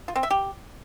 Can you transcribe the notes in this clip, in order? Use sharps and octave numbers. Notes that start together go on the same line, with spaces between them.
F4
C4
E5
G4